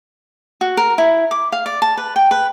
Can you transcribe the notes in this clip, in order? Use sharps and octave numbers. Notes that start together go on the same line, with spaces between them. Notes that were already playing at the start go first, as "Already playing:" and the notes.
F#4
A#4
E4
D6
F5
D5
A5
B4
G5
B4